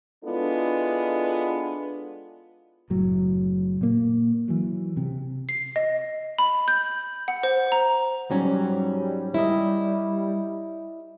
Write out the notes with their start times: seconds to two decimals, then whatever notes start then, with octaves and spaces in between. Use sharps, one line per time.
0.24 G#3 B3 D4 E4 F4 A4
2.90 F#1 A2 F#3
3.81 A#2 A#3
4.48 E3 F#3
4.97 C3
5.49 C7
5.76 D#5
6.39 B5
6.68 G6
7.28 F#5
7.43 C5
7.72 A#5
8.30 G#2 F#3 G3 C#4
9.34 E4 A#4 D#5